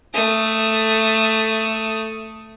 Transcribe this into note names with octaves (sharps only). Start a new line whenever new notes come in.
A3 D#6